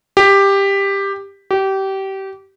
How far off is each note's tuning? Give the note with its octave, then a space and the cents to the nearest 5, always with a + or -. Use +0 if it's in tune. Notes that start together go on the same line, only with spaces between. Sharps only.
G4 +10
G4 -25